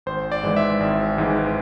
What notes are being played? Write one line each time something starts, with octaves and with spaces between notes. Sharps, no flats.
G#1 C5
D5
G#2 E3 G#3
E5
G#1
G#2 E3 G#3